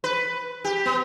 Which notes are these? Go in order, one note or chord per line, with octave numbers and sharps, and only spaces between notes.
B4
G4
B3